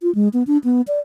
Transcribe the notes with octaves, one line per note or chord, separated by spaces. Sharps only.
F4
G#3
B3
D4
B3
D5